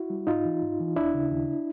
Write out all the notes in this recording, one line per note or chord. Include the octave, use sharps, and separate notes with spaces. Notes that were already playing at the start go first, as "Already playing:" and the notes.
Already playing: E4 F#4
G3
G#2 D#4 F4
E3
G#2
E3
D#2 D4 E4
C#3
D#2